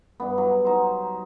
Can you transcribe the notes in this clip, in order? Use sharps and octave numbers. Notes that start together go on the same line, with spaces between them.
G2 B3
F#3
D#4 C5